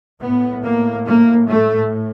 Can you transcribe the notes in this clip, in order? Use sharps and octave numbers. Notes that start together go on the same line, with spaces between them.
A2 B3
A#3
A#3
A3